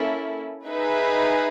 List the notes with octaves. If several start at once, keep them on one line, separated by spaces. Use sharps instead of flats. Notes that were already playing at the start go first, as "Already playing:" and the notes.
Already playing: A#3 C#4 E4 A4
D#4 G#4 B4 E5